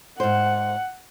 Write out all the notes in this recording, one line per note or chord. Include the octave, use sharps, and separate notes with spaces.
G#2 C5 F#5